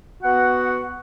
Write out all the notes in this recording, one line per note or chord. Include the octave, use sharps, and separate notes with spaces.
B3 F#4 F#5